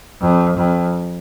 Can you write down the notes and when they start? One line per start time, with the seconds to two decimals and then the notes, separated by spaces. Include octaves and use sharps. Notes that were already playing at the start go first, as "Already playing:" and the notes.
0.21 F2
0.58 F2